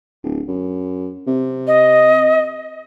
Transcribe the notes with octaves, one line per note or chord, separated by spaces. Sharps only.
D1
F#2
C3
D#5